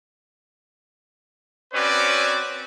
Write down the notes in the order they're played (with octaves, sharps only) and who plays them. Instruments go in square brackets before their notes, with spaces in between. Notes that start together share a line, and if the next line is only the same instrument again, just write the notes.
[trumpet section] C4 C#4 F#4 B4 C#5 D5